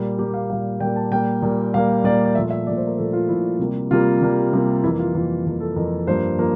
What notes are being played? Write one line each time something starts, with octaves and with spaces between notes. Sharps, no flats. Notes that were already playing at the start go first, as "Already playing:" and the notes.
Already playing: A#2 G3 A#3
A#2 G3 A#3 G4
F5
A#2 G3 A#3 F5
A#2 G3 A#3 G5
A5
A#2 G3 A#3 G5
A#2 G3 A#3
A#2 G3 A#3 F5
A#2 G3 A#3 D5
D5
A#2 F3 A3 E5
E5
A#2 F3 A3 D5
C5
A#4
A#2 F3 A3 A4
F4
A#2 F3 A3 E4
C3 G3 A#3
C3 G3 A#3 F4
C3 G3 A#3
C3 G3 A#3
F2 E3 A#3 E4
F4
F2 E3 A#3 F4
F2 E3 A#3
A4
F2 E3 A#3 A#4
G2 F3 A#3 C5
F3 A#3